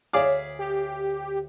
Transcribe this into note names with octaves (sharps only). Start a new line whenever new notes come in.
D2 G#4 C#5 D5 E5 F5
G4